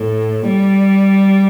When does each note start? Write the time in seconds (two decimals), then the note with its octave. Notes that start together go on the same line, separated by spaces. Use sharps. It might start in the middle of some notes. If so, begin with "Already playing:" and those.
Already playing: A2
0.48 G3